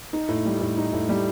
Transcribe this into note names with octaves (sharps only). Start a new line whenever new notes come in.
D#4
A2
G3
A2
D#4
A2
G3